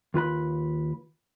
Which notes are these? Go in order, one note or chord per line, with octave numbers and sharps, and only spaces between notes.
D#2 F4 B4 B5